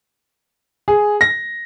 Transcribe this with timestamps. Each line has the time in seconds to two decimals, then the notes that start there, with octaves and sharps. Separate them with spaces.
0.88 G#4
1.21 A#6